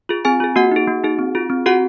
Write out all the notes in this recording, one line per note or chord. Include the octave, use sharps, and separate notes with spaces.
F4 G#4
C4 G#4 G#5
F4 G#4
A#3 F#4 F#5
D#4 G#4
A#3
D#4 G#4
C4
F4 G#4
C4
F4 F#4 G#4 F#5